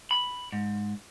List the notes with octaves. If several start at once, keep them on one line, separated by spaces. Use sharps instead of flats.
B5
G#2